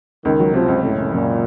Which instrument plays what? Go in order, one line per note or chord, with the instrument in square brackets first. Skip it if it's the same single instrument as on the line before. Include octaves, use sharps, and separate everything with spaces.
[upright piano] C#2 [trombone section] D#3
[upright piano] F#3
[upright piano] C3 [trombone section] F3
[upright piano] C#2
[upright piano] F#2 [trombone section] A2
[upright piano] F#1
[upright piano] F#2 [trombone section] A#2